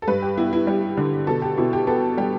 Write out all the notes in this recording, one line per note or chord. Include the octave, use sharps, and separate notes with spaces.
A4
G2 B4
G4
B3 E4
E4
G3 G4
D3
B2 A4
G4
B2 E4
G4
B3 A4
G3 G4